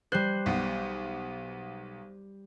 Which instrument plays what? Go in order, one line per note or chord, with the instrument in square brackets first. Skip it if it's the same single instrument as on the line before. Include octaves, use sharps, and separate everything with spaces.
[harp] G3 C5 [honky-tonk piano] F#6
[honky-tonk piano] B1 B3